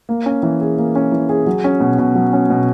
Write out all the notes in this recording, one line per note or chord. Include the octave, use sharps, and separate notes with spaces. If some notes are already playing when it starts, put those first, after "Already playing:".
A#3
C#4
E3
G#4
A#3
C#4
E3
G#4
F#3
C#4
B2
B2
F#3
C#4
B2